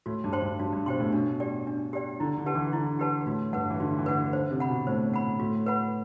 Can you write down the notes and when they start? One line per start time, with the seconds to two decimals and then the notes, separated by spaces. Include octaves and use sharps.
0.06 A2 F#4
0.24 G2
0.33 C5 G5 C6
0.42 G2
0.59 G2 F#4
0.73 G2
0.86 B2 C5 G5 C6
1.00 A2
1.13 B2 D4
1.40 G4 D5 G5
1.67 D4
1.93 G4 D5 G5
2.20 D3 E4
2.37 D3
2.46 G4 B4 F#5 A5
2.55 E3
2.73 D3 E4
2.99 G4 B4 F#5 A5
3.26 A2 F#4
3.53 G2 B4 F#5
3.70 E3
3.80 D3 F#4
3.98 E3
4.06 D3 B4 F#5
4.33 D3 C5
4.51 C3
4.60 F#5 B5
4.69 B2
4.87 A2 C5
5.14 F#5 B5
5.40 A2 F#4
5.66 B4 F#5 B5